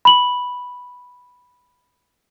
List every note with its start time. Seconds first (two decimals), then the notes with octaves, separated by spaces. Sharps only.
0.05 B5 F#7